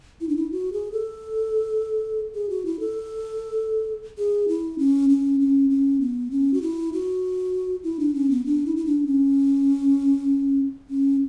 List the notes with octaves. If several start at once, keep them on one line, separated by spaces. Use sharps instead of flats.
E4
D4
E4
F#4
G#4
A4
G#4
F#4
E4
A4
G#4
E4
C#4
C#4
C#4
C#4
B3
C#4
F#4
E4
F#4
E4
D4
C#4
B3
D4
E4
E4
D4
C#4
C#4